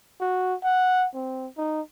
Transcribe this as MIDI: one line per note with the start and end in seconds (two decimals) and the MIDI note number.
0.21 0.55 66
0.64 1.07 78
1.14 1.48 60
1.58 1.81 63